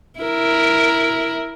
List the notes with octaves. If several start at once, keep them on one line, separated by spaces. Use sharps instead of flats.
E4 A#4